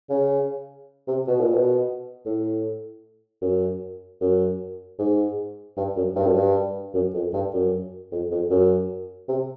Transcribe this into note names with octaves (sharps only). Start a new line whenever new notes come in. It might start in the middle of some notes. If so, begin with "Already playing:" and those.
C#3
C3
B2
A#2
B2
A2
F#2
F#2
G#2
G2
F#2
G2
F#2
G2
F#2
F2
G2
F#2
F2
F2
F#2
C3